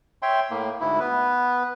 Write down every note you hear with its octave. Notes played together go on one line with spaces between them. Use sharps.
C#5 E5 G5 C6
A2 A#3
D2 G#2 E4
B3 B4